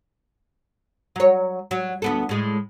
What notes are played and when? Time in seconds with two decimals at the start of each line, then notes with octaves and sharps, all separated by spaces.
1.16 F#3 C#5
1.71 F#3
2.02 D2 B3 A4
2.29 A2 G#3